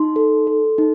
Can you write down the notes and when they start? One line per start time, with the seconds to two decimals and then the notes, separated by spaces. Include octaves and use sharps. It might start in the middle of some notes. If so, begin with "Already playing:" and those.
Already playing: D#4 C6
0.16 A4
0.47 A4
0.78 D#4